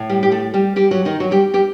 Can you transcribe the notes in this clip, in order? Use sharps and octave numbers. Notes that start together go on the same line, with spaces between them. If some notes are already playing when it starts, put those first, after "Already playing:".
Already playing: A2
G3 G4
G4
A3 A4
G3 G4
G3 G4
F#3 F#4
D#3 D#4
F#3 F#4
G3 G4
G3 G4